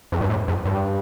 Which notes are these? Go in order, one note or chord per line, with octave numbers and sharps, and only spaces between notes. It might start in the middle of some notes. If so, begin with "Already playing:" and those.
F2
G2
A2
F2
G2